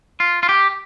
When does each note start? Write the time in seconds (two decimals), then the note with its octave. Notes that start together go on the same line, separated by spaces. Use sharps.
0.20 F4
0.43 F4
0.49 G4